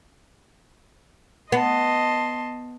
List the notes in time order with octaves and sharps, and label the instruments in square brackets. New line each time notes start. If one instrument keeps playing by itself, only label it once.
[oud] B3 [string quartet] D#5 A5 C6